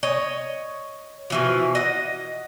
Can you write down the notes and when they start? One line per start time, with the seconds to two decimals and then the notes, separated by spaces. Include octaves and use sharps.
0.03 C#5 D#5
1.30 B2 E3 F3
1.75 D#5 F#5